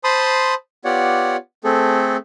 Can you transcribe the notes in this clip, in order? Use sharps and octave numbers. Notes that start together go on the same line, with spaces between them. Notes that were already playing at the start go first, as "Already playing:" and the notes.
C5 A5 B5 C6 D#6
B3 F4 G4 C#5 D5 F#5
A3 C4 G#4 A4